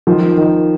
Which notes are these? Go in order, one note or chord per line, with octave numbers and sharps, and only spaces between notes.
D#3 F3
D#3